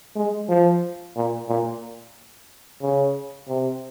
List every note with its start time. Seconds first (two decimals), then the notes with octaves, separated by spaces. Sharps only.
0.16 G#3
0.49 F3
1.16 A#2
1.49 A#2
2.82 C#3
3.48 C3